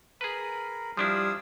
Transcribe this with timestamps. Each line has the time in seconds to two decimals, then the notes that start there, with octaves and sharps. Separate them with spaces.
0.21 G#4 A#4 B4 B5
0.97 F3 G3 D4 E4 F5 D#6 E6